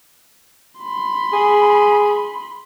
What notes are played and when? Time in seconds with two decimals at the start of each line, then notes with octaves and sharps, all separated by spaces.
0.80 B5 C6
1.33 G#4